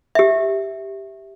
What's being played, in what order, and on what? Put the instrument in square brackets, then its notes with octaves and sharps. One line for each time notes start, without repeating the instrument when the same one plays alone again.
[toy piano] G4 E5